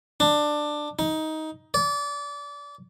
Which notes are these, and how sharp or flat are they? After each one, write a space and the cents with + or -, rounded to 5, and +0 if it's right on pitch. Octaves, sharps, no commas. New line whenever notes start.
D4 +15
D#4 +15
D5 -30